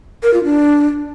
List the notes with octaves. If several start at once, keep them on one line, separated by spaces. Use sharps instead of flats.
A#4
F4
D4